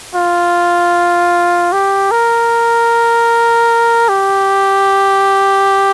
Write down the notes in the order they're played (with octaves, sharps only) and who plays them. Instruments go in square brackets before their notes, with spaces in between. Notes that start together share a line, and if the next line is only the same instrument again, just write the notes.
[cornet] F4
G4
A#4
G4